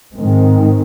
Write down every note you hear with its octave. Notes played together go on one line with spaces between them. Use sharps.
G#2 D#3 G#3 C4